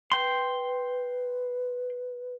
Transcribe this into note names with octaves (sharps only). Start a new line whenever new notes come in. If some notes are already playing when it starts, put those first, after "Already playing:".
B4 G5 C6